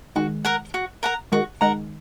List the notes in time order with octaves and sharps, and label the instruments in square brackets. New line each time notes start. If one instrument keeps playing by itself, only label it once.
[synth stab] D#3 G#3 [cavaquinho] F#4
[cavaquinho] A#4 F#5 A#5
F#4
A#4 F#5 A#5
[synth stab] D#3 G#3 [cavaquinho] F#4
[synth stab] D#3 G#3 [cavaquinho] A#4 F#5 A#5